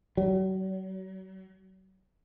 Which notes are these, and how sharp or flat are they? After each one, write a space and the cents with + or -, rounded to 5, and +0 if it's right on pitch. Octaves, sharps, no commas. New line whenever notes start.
F#3 +40